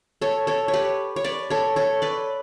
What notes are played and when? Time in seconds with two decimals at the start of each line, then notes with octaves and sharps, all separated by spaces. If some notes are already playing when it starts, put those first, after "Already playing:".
0.21 A4 C#5
0.47 A4 C#5
0.68 C#5
0.73 G4 B4
1.16 C#5
1.24 B4 D5
1.50 A4 C#5
1.76 A4 C#5
2.02 B4 D5